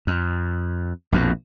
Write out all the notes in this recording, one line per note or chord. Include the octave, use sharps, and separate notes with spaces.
F2
A#1 F2 B2